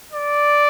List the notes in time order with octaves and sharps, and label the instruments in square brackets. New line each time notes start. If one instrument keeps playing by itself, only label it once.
[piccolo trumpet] D5